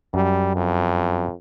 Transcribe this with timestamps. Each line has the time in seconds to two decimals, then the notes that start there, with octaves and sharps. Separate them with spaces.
0.14 F#2 G3
0.55 F2